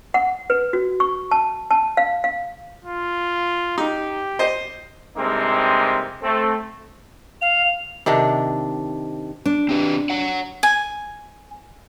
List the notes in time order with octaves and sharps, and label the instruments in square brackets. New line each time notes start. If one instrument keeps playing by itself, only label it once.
[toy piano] F#5
B4
F#4
C#6
A5
A5
F5
F5
[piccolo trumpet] F4
[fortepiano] D#4 [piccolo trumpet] G4
[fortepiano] C5 D#5
[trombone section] G2 C3 G#3 A#3 C4 D#4
A3 C4
[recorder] F5 [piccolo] F7
[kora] C3 D#3 D4
[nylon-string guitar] D4
[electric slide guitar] C4 G4 B4
C#5 F#5
[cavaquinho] G#5